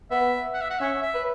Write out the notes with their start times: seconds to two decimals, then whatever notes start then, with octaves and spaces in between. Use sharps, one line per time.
0.11 B3 E5
0.54 F#5
0.62 E5
0.70 F#5
0.79 C#4 E5
1.02 E5
1.14 B4